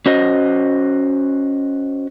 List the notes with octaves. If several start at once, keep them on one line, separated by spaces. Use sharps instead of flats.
C#4 F#4 C5 D#5